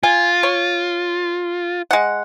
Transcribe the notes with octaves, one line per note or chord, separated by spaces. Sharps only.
F4 G#5
C#5
G#3 F#5